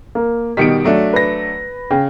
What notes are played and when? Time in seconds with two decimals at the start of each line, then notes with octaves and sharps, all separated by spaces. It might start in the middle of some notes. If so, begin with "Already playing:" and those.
0.15 A#3
0.57 B2 D#3 G3 B6 C#7 D7
0.85 F#3 A3 D4
1.13 B4 A#6
1.91 C#3 G5